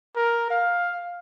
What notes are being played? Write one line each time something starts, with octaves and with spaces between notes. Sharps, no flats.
A#4
F5